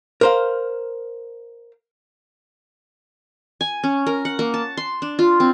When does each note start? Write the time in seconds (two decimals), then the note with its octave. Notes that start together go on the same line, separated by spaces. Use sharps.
0.21 A#4 C5 F5
3.61 G#5
3.84 C#4
4.07 A#4
4.25 F#5
4.39 A#3
4.54 A5
4.77 C6
5.02 D4
5.19 F4
5.40 C4